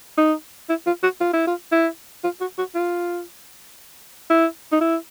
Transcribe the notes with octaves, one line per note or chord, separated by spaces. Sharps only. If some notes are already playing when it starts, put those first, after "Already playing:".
D#4
E4
F4
F#4
F4
E4
F4
E4
F4
F#4
F#4
F4
E4
D#4
E4